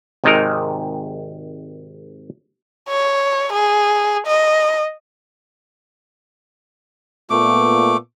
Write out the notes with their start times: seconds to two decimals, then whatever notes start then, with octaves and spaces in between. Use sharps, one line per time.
0.24 G#1 C3 D#3 G#3 D#4 A#4
2.88 C#5
3.53 G#4
4.27 D#5
7.30 A#2 A3 B3 F4 D6